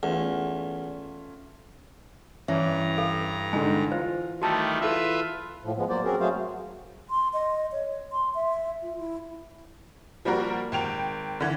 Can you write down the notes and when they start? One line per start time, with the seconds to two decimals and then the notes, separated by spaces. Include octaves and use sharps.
0.03 E2 A3 C#4 F4
2.48 G2 E3 C#4 E5 A#5
2.98 A4 F5
3.53 G#2 D3 G#5
3.92 F4 C5
4.42 D#3 G3 A3 F#4 A5
4.81 E4 F4 A4 B4 E5
5.63 A2 F3
5.77 F3 G#3 B3
5.89 F#3 A#3 C5 D5
6.04 C4 C#4 F#4 G#4 A#4
6.20 F#3 A3 F#4 G#4 C5 F5
7.10 C6
7.33 D#5
7.72 C#5
8.12 C6
8.35 E5
8.82 F4
8.98 E4
10.25 F3 G3 A#3 F#4 A#4
10.72 G#1 G5 F7
11.41 D3 E3